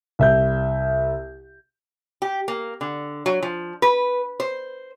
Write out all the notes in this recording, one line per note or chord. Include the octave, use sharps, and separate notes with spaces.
C2 E5 G6
G4
A#3
D3
F#3
F3
B4
C5